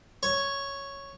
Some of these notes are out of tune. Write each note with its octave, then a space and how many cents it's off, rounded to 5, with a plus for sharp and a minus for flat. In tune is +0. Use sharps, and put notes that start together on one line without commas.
C#5 +0